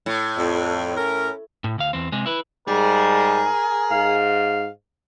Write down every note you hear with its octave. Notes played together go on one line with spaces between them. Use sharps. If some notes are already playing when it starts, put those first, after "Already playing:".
A2
F2
C#4 A#4
A2
D2 F5
E2 C4
C3 G#3
E4 B4
G#2 G3 G#4 A#4
G#2 F5